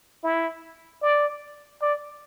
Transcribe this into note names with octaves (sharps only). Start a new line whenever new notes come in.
E4
D5
D5